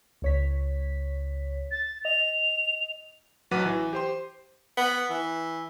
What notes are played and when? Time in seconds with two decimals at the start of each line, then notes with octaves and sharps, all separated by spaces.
0.22 C#2 C#5 B6
1.71 A6
2.05 D#5 F7
3.51 A1 F#3 B4 F#5 D6 D#7
3.66 E3
3.93 G4 C5 C6
4.77 B3
5.10 E3